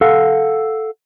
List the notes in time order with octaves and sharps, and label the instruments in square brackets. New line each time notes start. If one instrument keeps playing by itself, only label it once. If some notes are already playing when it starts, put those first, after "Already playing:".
[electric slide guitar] A4 F5 F#5